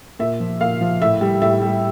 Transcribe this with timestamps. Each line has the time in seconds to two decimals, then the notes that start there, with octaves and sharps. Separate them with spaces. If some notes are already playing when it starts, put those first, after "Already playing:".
0.19 A#2 E5
0.40 F3
0.61 A#2 F5
0.81 F3
1.01 A2 E5
1.21 G3
1.41 A2 E5
1.62 G3